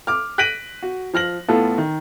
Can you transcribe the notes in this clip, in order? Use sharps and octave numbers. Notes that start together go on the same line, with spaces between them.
D6 F6
F#6 A#6 B6 D7 D#7 F#7
F#4
F3 F6 A#6 F#7
A2 B3 F4 A4
D#3